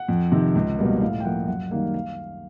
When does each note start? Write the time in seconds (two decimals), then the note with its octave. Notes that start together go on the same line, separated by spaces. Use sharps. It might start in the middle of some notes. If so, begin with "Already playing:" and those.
Already playing: F#5
0.08 F2
0.32 C3 D#3
0.55 C#2
0.79 B2 G3 A#3
1.01 A2 F5
1.20 G5
1.25 F3 A#3 F#5
1.48 F#2 F#5
1.71 D#3 G3 A#3 F5
1.94 F5